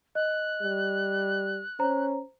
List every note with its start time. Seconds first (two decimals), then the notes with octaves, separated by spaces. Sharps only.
0.15 D#5 F#6
0.62 G3
1.79 C#4 C5 A#5